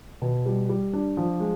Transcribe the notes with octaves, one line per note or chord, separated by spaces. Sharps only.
B2
G3
G3
D4
F3
G#3